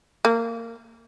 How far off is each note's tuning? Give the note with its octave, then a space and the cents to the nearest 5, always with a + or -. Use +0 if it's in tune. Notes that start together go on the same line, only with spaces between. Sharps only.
A#3 -20